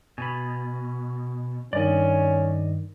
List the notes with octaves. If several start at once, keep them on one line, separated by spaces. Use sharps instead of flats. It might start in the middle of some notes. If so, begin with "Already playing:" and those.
B2 G#5 B5
G2 D#3 C#4 D5 D#5